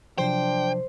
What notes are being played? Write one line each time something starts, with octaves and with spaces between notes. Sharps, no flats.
C3 F3 F#3 D4 C5 G5